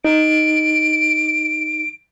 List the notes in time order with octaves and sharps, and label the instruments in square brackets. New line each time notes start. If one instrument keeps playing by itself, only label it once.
[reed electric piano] D#4 [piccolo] D7